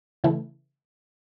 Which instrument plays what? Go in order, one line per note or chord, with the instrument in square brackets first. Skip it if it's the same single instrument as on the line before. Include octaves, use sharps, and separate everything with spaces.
[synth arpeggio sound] C#3 E3 A3 E4